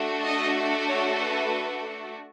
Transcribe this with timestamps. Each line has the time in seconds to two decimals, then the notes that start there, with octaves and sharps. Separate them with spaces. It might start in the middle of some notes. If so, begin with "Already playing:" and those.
Already playing: A3 D4 F#4 A4
0.25 D#5
0.88 C#5
1.19 B4